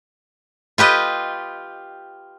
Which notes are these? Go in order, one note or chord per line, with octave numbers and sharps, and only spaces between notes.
F4 G4 B4 D#5